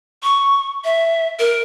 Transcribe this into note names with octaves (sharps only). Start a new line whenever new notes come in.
C#6
E5
A#4